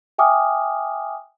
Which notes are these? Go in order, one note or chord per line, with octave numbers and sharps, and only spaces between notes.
E5 G5 G#5 D6 D#6 F6